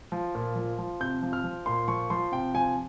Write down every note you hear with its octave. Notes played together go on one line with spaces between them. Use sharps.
F3
A#2
F3
F3
C3 G6
F3
F6
F3
A#2 C6
F3 C#6
F3 C6
C3 G5
F3 G#5